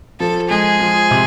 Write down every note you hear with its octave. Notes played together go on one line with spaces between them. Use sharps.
F3 A4
G#3 G#4
F3
C3